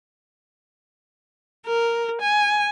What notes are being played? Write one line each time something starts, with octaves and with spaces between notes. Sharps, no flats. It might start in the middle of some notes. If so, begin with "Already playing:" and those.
A#4
G#5